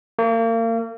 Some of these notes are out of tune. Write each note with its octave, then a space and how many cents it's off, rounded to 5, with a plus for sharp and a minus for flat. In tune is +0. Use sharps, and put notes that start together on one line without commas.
A#3 -35